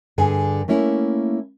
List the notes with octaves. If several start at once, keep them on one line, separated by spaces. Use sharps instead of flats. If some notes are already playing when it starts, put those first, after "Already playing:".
G2 D3 G#4 G#5
A3 A#3 C#4 E4